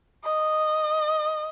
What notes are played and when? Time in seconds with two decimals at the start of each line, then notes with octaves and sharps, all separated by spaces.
0.25 D#5